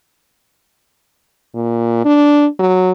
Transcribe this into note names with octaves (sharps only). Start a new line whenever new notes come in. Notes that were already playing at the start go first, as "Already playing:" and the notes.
A#2
D4
F#3